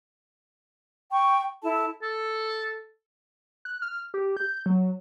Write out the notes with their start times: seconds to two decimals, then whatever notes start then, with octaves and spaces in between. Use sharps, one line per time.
1.11 G5 C#6
1.62 E4 A4 A5
2.02 A4
3.65 F#6
3.82 F6
4.14 G4
4.37 G6
4.66 F#3